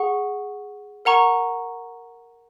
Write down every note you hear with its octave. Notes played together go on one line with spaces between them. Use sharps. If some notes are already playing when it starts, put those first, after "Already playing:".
Already playing: G#4 F#5 C#6
A#4 F#5 A#5 C#6